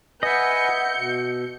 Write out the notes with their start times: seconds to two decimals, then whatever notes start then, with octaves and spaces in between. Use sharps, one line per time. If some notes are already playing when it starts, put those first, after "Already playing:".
0.23 B4 D#5 E5 F#5 G#5 G6 C#7
0.98 B2